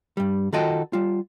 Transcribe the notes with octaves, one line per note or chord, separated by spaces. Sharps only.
G2 G3
D#3 F4 F#4 A4 D#5 G5
G3 F4